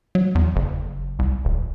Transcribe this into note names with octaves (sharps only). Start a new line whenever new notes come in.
F#3
E2
F#1
C2
D#1